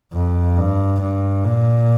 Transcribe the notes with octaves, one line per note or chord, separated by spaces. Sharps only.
F2
G2
G2
A#2